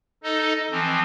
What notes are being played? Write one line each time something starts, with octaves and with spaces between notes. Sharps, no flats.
D#4 A4 D#5
E3 F3 C4